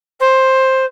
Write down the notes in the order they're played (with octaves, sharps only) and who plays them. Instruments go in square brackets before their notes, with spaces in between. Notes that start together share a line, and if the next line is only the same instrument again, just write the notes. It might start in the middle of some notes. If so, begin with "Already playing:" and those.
[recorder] C5